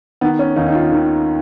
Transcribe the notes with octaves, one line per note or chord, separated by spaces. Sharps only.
D#3 B3
C#4
D#2 D#4
D#4
F4
D#3